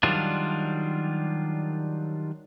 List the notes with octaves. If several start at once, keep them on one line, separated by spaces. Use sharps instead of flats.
D#3 F#3 G3 D4 F4